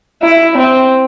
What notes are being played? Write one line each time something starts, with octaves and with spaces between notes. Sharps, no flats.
E4
C4